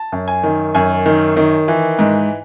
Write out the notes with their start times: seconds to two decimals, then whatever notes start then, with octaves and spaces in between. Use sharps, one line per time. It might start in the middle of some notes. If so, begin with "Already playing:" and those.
Already playing: A5
0.12 F#2
0.28 G#5
0.44 D#3
0.75 F#2 G#5
1.06 D#3
1.37 D#3
1.68 E3
1.99 G#2